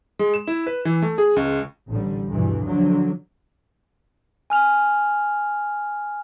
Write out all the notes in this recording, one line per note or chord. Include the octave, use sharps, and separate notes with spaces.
G#3
E7
E4
B4
E3
A3
G#4
C#2
A1 D3 G3
D2 G2 B2 E3
D3 F3 F#3
G#5 F6 F7